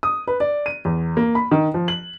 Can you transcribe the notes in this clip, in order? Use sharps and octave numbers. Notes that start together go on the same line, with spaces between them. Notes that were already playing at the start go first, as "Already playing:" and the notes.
D#6
B4
D5
D#7
E2
A#3
B5
D#3
F3
F#7